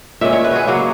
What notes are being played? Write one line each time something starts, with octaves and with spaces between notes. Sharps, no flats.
A#2 G#3 C#4 E5
C#5
B4
F#4 G#4
C#3 F#3 A#3 F#4